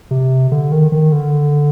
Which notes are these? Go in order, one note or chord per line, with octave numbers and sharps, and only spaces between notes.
C3
D3
D#3
D#3
D3